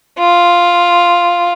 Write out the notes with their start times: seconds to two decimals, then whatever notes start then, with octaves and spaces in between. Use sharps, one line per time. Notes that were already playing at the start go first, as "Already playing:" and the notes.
0.19 F4